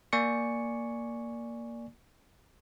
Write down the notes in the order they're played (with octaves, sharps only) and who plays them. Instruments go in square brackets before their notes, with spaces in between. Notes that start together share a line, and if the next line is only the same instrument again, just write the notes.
[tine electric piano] A#3 D5 G#5 C#6 C#7